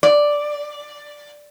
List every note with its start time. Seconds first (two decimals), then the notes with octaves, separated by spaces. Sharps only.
0.03 D5